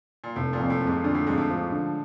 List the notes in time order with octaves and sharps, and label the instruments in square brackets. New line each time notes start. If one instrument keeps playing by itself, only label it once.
[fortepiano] A#2
[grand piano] F1 [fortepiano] A2
[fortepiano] A#2
[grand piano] F2
[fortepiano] A#2
A2
[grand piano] F2
[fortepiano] G#2
[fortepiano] A#2 [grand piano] D3
[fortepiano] A2
[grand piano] F2 [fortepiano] G#2
[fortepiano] A2
[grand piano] F3
D3